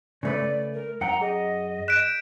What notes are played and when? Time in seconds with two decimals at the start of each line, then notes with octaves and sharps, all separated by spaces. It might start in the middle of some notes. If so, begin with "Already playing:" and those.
0.23 C#3 A3 B4 D5
0.74 A#4
1.01 F#2 F#5 G5 A#5 C#7
1.21 G#4 D#5
1.88 F#6 G6 B6 D7 E7